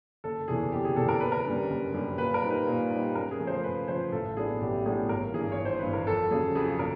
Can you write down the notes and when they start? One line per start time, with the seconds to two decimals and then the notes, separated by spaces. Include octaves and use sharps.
0.24 F#1 A4
0.48 E2 C3 E3 G#4
0.72 F#1 G4
0.85 G#4
0.96 E2 C3 E3 A4
1.08 A#4
1.20 F#1 B4
1.32 A#4
1.45 F#2 D3 G3
1.69 F#1
1.94 F#2 D3 G3
2.18 A#2 B4
2.34 A#4
2.42 G3 C4 D#4
2.50 B4
2.67 A#2
2.91 G3 C4 D#4
3.15 F#2 A#4
3.31 G#4
3.39 C#3 F3 A3
3.47 C5
3.63 F#2 B4
3.88 C#3 F3 A3 C5
4.12 A1 A4
4.37 A2 F#3 B3 D4 G#4
4.61 A1 G4
4.85 A2 F#3 B3 D4 G#4
5.09 G#1 A#4
5.34 G2 E3 G#4
5.52 C#5
5.58 G#1
5.65 C5
5.79 G2 E3 B4
5.93 A#4
6.07 F2 A4
6.31 C#3 F#3 G#4
6.55 F2 G#4
6.79 C#3 A#4